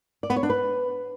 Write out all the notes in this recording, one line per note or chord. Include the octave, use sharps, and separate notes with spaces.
D5
B3
C#5
D4
B4